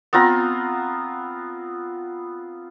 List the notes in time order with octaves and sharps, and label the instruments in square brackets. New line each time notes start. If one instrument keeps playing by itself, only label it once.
[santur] B3 C4 F4 A#5